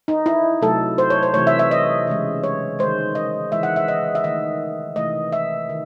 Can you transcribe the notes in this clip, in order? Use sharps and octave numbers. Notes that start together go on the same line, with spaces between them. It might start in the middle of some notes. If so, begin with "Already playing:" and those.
D#4
E4
C3 F#3 A3 A4
C5
C#5
C5
C3 E3 A3 C#5
E5
E5
D#5
C#3 E3 G#3
C#5
D#3 G#3 C5
D#5
C#3 E3 G#3 E5
F#5
E5
D#5
E5
D#3 A3 D#5
C3 E3 A3 D#5
E5
D#3